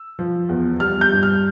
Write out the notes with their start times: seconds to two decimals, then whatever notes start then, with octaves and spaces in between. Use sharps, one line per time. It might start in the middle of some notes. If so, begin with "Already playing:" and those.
Already playing: E6
0.19 F3
0.49 E2
0.80 G3 F6
1.01 G6
1.12 G2
1.23 F6